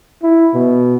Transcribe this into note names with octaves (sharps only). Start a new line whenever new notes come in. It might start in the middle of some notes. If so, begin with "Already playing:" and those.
E4
B2